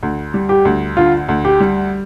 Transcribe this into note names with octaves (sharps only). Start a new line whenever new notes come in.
D2
G3
G4
D2
D3 F4
D2
G4
G3